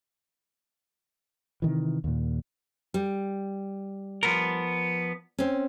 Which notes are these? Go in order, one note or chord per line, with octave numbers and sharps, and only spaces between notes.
C3 D#3 E3
D#2 A#2
G3
F3 B3 A#4
C4 C#4